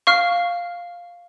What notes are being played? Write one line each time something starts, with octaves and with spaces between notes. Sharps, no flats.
F5 C#6 F6